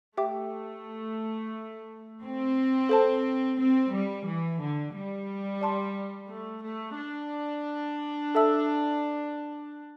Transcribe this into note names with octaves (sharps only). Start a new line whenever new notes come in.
A3 G4 E5 G5 D6
C4
A4 C5 A5
C4
G3
E3
D3
G3
D5 A5 C6
A3
A3
D4
A4 E5 A5 E6